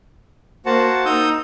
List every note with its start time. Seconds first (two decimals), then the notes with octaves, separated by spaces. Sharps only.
0.66 A#3 F#4 C5 F#5 A5
1.05 D#4 D#6 E6 G6